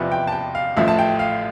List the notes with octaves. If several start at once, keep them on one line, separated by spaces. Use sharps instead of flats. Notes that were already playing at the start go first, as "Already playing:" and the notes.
Already playing: E2 C3 F3 B3 D5 E5
G5
A5
G5
F5
A1 A2 F3 E5
A5
G5
F5